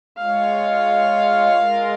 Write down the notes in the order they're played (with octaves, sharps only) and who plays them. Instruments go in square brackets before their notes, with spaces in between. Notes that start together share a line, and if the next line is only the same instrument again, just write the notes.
[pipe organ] G#3 F4 C#5 [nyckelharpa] F5
[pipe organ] G#3 F4 A#4